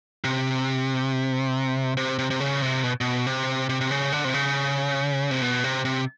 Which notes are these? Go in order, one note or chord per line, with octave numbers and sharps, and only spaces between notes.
C3
C3
C3
C3
C#3
C3
B2
B2
C3
C3
C3
C#3
D3
C3
C#3
C3
B2
C3
C3